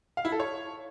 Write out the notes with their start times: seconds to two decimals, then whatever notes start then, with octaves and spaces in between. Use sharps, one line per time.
0.17 F5
0.25 E4
0.32 A4
0.40 C#5